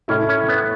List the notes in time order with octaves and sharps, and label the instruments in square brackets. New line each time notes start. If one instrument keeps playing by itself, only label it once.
[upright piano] A2 A3 E4 A4 E5 [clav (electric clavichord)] C#4
[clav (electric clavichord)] C#4
B3